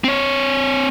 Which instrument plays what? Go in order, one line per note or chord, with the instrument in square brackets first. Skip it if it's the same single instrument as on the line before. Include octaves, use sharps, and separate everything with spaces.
[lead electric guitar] C4 C#5